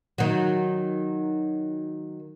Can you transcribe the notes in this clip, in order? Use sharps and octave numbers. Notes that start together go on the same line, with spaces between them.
D#3 F#3